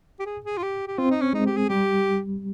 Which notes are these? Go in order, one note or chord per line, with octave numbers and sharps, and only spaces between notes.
G4
G#4
G#4
F4
G4
G4
C4 F4
D#4
C#4
G#3 D#4
G4
G#4
G3 G4